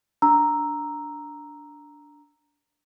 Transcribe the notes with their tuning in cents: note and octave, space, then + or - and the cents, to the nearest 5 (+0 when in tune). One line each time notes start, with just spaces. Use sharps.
D4 -10 A#5 +0 E6 +0